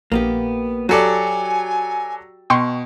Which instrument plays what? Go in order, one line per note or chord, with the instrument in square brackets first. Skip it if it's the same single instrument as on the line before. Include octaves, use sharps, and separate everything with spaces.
[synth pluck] A#1 [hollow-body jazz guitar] A#3 B3 G4
[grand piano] F#3 A4 D5 [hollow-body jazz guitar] F#4 G4 [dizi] G#5
[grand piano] B2 [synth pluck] G5 C6 C#6